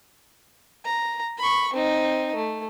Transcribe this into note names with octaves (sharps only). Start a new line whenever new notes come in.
A#5
B5 C#6
C4 D#4
A3